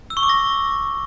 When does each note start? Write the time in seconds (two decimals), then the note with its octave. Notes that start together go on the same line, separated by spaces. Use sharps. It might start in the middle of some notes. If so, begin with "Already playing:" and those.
0.10 E6
0.17 C#6
0.23 D6
0.29 A#6